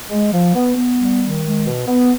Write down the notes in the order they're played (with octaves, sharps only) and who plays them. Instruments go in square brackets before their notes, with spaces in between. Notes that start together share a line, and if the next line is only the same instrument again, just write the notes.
[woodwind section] G#3
F3
B3
B3
G3
D#3
G#3
B2
B3